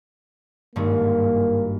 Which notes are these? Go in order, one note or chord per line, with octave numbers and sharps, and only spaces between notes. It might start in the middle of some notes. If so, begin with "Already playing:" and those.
G#1 G2 A#3